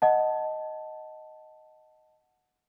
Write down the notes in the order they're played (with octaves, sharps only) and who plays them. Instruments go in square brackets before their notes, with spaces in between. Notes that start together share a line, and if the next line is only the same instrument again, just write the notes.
[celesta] D#5 F#5 A5